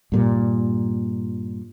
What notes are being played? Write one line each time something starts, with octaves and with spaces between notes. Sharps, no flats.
G2 A#2 G3